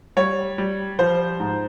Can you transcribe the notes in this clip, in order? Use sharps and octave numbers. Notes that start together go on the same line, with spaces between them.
G3 C#5
G3
F3 C5
G#2